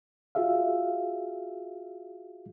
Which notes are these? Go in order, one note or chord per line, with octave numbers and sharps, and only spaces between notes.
F4 F#4 G#4 E5 F5